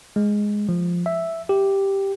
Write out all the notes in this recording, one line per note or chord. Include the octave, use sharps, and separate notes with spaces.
G#3
F3
E5
G4